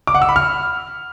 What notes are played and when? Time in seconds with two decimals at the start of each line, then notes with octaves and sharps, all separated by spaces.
0.07 D6
0.15 F#5
0.22 E6
0.29 B5
0.36 F6